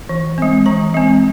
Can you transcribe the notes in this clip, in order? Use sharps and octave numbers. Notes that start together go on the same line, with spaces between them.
E3
G#3 C4
E3 A#5
G#3 C4